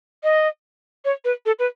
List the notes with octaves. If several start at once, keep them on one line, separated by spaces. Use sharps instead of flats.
D#5
C#5
B4
A4
B4